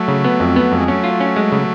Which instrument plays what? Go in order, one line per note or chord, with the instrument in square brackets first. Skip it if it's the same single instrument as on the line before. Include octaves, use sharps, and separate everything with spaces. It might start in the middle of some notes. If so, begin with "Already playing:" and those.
Already playing: [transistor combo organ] F#3 A3
[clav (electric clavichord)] C#3
B3
F2
B3
F2
[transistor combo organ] G#3
[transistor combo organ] F#3 A3 [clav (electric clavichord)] C#4
[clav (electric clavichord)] F4
C#4
G#3
C#3